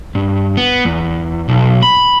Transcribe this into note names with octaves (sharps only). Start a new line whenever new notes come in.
G2
B3
E2
B1
B5